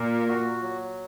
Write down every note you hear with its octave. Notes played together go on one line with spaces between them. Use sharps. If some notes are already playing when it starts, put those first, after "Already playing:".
Already playing: A#2 A#4
F#4
F#3